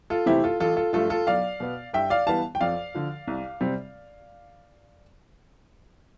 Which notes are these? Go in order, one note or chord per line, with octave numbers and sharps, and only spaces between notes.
F4 A4
C3 E3 A3 C4 E4 G4
F4 A4
A1 F4 A4
F4 A4
G2 F3 A3 F4 A4
F4 A4
B1 D5 F5
B2 B3
G2 E5 G5
D5 F5
E3 G3 B3 F5 A5
G5
F2 D5 F5
D3 F3
C2
C3 G3 C4